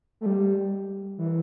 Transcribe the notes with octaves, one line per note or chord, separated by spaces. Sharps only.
A3
G3
E3